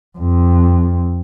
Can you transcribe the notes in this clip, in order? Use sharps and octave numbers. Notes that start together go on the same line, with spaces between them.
F2